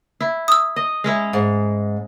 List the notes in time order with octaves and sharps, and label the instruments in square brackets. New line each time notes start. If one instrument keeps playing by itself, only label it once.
[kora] E4
[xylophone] D#6 E6
[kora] D#5
G#3 C#4 E4
[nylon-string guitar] G#2